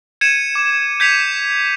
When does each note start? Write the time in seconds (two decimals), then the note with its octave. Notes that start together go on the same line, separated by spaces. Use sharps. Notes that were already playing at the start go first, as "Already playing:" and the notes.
0.21 G#6 C#7 D#7 E7
0.55 D6
1.00 G6 G#6 B6 C#7 D#7 F7